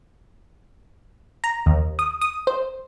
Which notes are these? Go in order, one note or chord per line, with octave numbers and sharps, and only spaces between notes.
A#5
D#2
D#6
D#6
C5